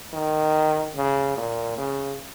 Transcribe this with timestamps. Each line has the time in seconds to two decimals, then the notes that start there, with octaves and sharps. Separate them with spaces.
0.13 D#3
0.96 C#3
1.37 A#2
1.78 C#3